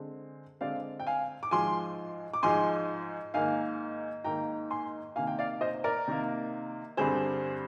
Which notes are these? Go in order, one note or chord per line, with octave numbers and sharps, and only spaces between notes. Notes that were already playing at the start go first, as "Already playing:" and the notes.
Already playing: D3 G#3 C4
D3 G#3 C4 D5 F5
G5
F5 G#5
D6
G#2 F3 G#3 G#5 C6
D6
G#2 F3 G#3 G#5 C6
G#2 D#3 A#3 F5 G#5
G#2 D#3 A#3 G5 A#5
G#5 C6
C3 D#3 A#3 F5 G#5
G5
D5 F5
C5 D#5
A#4 D5
C3 D#3 A#3
G2 D3 G3 C4 G#4 C5